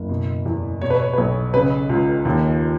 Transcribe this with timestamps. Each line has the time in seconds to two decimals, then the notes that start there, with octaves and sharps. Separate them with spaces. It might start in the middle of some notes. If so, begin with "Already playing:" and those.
Already playing: F#1
0.09 B2
0.45 E2
0.81 B2 C#5
0.90 B4
1.00 C#5
1.13 B4
1.17 B1 C#5
1.54 C#3 B4
1.89 C#2
2.25 D#2